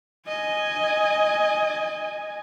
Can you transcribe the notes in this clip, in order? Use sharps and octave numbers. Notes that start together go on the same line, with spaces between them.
D#5 G#5